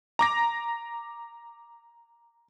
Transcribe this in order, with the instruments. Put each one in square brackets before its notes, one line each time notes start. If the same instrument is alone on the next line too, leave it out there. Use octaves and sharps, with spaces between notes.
[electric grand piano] A#5 D6 A#6